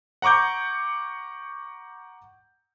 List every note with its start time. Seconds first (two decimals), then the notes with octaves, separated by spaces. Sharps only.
0.22 F#5 A#5 C#6 D6 G6